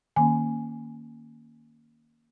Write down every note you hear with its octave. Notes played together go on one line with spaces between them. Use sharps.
D#3 A#3 C#4 G#5